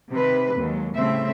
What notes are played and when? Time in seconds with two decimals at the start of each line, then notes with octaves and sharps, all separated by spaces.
0.11 C3 D#3 C4 B4
0.56 D#2 F#3 G#3
0.94 A2 C#3 G3 A3 C4 E5